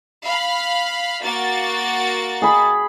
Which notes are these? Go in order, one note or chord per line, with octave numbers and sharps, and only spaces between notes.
F5 B5
A#3 F#4 A6
G#4 B5